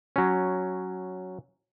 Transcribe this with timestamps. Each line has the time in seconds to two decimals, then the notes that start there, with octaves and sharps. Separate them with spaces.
0.16 F#3 C#4